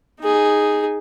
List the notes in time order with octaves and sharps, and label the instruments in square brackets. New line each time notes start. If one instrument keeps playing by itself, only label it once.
[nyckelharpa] D#4 G#4